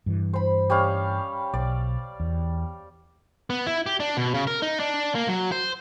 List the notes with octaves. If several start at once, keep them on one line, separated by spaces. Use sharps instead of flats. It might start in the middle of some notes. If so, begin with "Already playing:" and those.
G2 E3
C5 B5
G3 C#4 F5
B1 D5
E2
B3
E4
G4
D4
B2
C#3
A#4
D#4
D4
A#3
F#3
C5